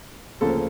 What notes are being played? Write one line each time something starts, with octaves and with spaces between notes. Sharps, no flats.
D2 C#3 F3 A#3 A4